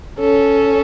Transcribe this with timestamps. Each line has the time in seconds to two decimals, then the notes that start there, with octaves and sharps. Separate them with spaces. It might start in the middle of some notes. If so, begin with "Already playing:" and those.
0.19 C#4 A4